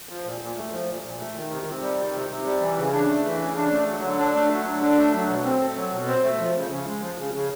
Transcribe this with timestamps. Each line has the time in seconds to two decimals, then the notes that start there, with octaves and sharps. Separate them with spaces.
0.09 F3
0.24 A#2
0.41 A#2
0.57 A3
0.72 F3
0.87 A#2
1.03 A#2
1.20 A3
1.36 D#3
1.51 C3
1.66 C3
1.82 G3
1.98 D#3
2.14 C3
2.29 C3
2.46 G3
2.61 E3
2.78 C#3
2.93 D4
3.08 A3
3.25 E3
3.40 C#3
3.56 D4
3.72 A3
3.88 F#3
4.03 D3
4.19 D4
4.35 A3
4.51 F#3
4.67 D3
4.82 D4
4.97 A3
5.13 F#3
5.29 B2
5.45 C4
5.60 A3
5.76 F#3
5.93 B2
6.07 C4
6.24 A3
6.40 F3
6.55 C#3
6.71 C#3
6.87 G#3
7.02 F3
7.18 C#3
7.34 C#3